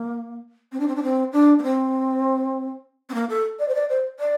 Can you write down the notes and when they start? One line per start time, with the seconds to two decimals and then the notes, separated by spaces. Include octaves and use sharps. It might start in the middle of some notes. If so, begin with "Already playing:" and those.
Already playing: A#3
0.72 C4
0.80 D4
0.88 C4
0.95 D4
1.03 C4
1.32 D4
1.59 A#3
1.63 C4
3.09 C4
3.14 A#3
3.29 A4
3.59 D5
3.68 C5
3.74 D5
3.89 C5
4.19 D5